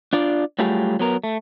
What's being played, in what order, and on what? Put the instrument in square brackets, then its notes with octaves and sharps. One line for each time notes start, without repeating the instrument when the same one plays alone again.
[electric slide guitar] D4 F4 D5
F#3 G3 A3 F4 G4 G#4
F#3 B3 A#4
A3